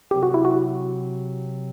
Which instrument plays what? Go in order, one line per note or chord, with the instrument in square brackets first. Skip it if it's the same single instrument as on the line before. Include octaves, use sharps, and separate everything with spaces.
[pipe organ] C3 F#3 C4 [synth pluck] G4
[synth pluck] F#4
E4
F#4